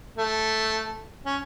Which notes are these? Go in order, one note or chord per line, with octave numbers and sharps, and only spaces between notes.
A3
C#4